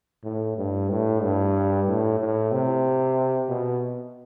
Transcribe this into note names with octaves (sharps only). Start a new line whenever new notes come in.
A2
G2
A2
G2
A2
A2
C3
B2